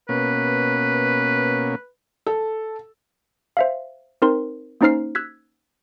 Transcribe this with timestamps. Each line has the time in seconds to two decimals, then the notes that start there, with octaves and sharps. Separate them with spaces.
0.09 B2 A#3 C#4 B4
2.26 A4
3.57 C5 E5 F5
4.22 C4 D#4 A#4 C5 C6
4.81 A#3 C#4 D#4 C5 F6 C7
5.15 E6 F#6 G#6 B6